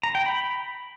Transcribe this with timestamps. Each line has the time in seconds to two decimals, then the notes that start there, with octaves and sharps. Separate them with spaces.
0.03 A#5
0.15 G5
0.26 B5